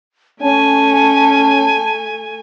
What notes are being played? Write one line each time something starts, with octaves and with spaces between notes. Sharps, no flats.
A3 C#4 G#5 A5